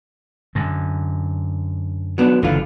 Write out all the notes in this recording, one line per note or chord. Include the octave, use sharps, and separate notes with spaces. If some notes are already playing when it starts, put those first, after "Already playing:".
F#2 D3
F#3 B3 D4
F#1 D3 E3 F4